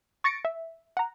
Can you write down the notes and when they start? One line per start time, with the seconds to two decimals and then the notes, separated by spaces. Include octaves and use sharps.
0.24 C#6 A6 A#6 C#7 D7
0.45 E5
0.97 F#5 A#5